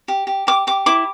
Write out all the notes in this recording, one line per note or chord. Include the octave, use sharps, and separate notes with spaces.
G4
G4
G4 D6
G4 D6
E4 D6